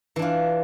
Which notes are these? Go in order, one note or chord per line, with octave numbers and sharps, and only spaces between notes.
E3 D4 F4